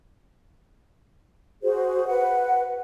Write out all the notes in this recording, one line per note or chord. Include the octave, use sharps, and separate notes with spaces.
F#4 G#4 C5
B4 F#5